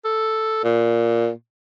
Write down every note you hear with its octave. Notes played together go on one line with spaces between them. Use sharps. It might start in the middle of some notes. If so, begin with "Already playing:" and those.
A4
A#2